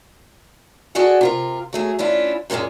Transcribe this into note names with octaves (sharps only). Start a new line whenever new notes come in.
F#4 G#4 A4 D5 F#5 G#5
C3 F4 A#4
F#3 A3 G#4
C#4 D4 E4 F4
F#2 A#2 G3 G#3 A#3